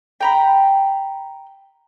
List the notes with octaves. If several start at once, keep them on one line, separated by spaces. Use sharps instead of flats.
G5 A#5 B5